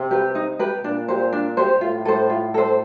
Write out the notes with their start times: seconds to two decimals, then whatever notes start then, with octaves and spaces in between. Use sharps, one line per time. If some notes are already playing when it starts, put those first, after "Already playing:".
Already playing: C3
0.11 G4 B4
0.35 D#4
0.59 G4 B4
0.83 A#2 D4
1.08 G4 C5
1.33 D4
1.57 G4 C5
1.81 A2 F4
2.05 A4 C5
2.30 F4
2.54 A4 C5